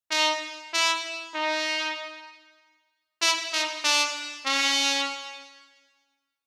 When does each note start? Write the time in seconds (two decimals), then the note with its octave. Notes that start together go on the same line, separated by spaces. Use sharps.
0.11 D#4
0.73 E4
1.35 D#4
3.21 E4
3.53 D#4
3.84 D4
4.46 C#4